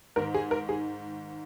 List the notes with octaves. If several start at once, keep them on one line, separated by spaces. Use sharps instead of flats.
G#2 D#3 A#4
G#4
A#4
G#4